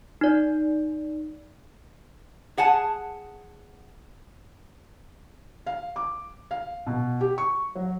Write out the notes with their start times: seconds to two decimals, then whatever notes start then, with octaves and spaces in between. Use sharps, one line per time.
0.21 D#4 D5
2.58 G#4 F#5 G#5 A5
5.66 F5
5.96 D6
6.51 F5
6.87 B2
7.21 G4
7.38 C#6
7.75 F#3